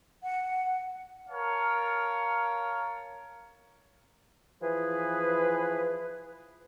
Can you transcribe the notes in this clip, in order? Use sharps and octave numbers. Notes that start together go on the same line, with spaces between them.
F#5
A#4 C#5 F5 A5
E3 F3 G#4 B4